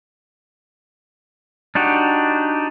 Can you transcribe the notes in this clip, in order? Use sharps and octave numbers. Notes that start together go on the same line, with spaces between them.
D4 D#4 F#4 G4